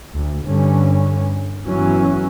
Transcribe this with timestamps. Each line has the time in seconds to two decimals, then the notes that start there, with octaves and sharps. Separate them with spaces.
0.13 D2
0.45 G2 D3 C#4
1.66 G1 E3 F#3 C#4